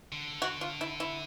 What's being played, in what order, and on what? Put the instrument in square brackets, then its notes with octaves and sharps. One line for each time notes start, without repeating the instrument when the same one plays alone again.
[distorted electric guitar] D3
[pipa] F#4
F4
E4
E4